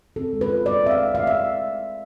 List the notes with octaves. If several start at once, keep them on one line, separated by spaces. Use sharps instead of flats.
C4 A4
G#3
B4
F4
G#3 D5
C4 E5
F5
G#3
A3 F5
E5